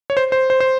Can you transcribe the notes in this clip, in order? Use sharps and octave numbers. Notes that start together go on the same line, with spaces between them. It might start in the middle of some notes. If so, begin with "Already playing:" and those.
C#5
C5
C5
C5
C5